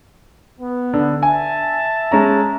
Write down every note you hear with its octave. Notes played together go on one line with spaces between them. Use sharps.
B3
D3
E5 G#5 A5
G#3 C#4 A#5